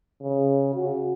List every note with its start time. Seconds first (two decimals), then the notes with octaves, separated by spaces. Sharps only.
0.22 C#3
0.75 F#4